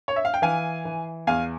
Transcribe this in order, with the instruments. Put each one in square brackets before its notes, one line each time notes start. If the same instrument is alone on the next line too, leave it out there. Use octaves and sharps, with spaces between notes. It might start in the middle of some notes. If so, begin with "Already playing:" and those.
[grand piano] C#5
E5
F5
G5
E3 F5 G#5
E3
E2 F5 G#5